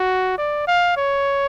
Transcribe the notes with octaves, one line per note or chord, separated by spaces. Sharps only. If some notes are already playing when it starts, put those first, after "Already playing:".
Already playing: F#4
D5
F5
C#5